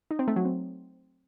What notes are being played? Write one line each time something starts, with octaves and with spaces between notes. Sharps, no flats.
D#4
C4
A3
F#3
C4